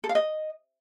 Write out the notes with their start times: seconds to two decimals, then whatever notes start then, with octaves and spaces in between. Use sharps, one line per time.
0.04 A4
0.09 F5
0.15 D#5